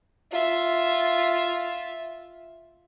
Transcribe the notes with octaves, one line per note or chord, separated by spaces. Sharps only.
F4 E5